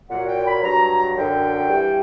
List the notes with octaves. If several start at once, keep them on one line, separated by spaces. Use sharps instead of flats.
A#2 F#3 F#5
G5
B5
G2 F#3 A#5
F#2 D3 F#3 G5
G2 E3 G3